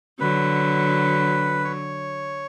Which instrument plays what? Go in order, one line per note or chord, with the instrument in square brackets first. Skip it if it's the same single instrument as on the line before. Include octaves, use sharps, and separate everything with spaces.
[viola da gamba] D3 F#3 [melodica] B4
[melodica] C#5